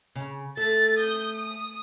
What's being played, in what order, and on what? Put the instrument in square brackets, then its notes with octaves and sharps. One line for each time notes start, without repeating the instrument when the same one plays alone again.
[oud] C#3
[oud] A3 [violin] A6
[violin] D#6 G6
D#6